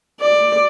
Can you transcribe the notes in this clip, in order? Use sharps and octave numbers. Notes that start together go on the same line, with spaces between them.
D5